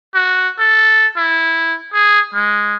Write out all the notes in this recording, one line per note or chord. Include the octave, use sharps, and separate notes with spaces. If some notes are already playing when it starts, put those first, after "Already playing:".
F#4
A4
E4
G#4
G#3